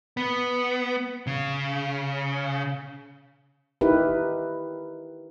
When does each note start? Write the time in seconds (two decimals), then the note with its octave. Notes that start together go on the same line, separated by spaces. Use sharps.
0.17 B3
1.27 C#3
3.81 D#4 E4 G4 A#4 B4